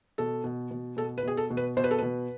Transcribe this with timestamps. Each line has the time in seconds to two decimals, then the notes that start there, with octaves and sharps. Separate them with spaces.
0.18 B2 A4
0.44 B2
0.71 B2
0.97 B2 A4
1.18 B4
1.23 B2 G#4
1.37 A4
1.50 B2
1.57 B4
1.77 B2 C5
1.84 B4
1.91 A4
1.98 B2 B4